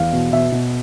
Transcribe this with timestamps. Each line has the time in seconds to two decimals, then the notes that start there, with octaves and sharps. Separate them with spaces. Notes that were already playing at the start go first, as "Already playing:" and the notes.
Already playing: E2 F5
0.13 B2
0.33 B2 E5
0.52 B2